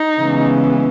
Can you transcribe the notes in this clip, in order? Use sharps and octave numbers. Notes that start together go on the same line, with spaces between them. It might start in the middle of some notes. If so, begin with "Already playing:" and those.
Already playing: D#4
C#3 E3 G#3 B3